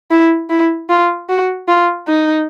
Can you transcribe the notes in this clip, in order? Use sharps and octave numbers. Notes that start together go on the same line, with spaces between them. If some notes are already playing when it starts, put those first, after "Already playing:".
E4
E4
F4
F#4
F4
D#4